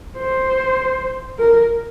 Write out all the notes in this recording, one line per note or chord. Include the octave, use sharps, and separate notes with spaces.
C5
A#4